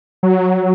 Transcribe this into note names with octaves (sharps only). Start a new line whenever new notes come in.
F#3